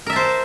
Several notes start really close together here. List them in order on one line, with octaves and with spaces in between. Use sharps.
A#4 E5 A5 C5